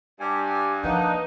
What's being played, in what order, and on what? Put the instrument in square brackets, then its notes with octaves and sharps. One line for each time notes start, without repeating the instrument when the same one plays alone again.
[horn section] G2 [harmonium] G4 G#5
[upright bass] F3 [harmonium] A#3 D4 F#5 [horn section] D#4 [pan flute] B4